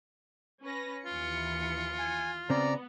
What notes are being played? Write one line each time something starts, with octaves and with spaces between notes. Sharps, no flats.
C#4 B4 A#6
D#2 E3 F4 C#7
G#5
C#3 B3 C4 D5 A#5